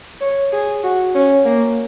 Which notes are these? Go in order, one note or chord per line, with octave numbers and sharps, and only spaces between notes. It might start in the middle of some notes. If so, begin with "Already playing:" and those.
C#5
G#4
F#4
C#4
A#3